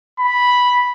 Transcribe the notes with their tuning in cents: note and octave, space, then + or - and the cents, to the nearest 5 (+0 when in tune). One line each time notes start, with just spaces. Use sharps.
B5 -5